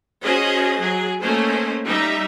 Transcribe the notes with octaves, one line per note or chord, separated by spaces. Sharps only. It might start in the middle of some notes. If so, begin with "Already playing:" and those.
C#4 F#4 G#4 C5 D#5
F#3 G#4
A3 A#3 C#4 C5 D#5
G3 D#4 E5